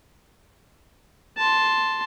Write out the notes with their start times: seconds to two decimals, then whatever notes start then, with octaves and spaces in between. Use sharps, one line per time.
1.38 A5 C6